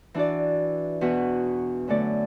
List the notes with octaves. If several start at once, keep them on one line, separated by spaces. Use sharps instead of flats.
E3 D4 F#4 D5
E2 B2 B3 F#4 B4
F#2 D3 A3 F#4 D5